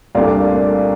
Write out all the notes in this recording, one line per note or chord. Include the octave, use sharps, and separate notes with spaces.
C2 A#2 A3 D4 D5 F5